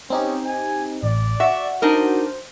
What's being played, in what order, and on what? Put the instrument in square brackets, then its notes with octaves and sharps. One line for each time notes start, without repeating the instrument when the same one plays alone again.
[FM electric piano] C4 D#4 G4 [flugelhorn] C#4
[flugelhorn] G#5
[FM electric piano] A1 [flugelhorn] D5
[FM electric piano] F#4 [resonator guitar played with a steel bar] E5
[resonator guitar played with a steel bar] D4 D#4 A#4 [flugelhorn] C5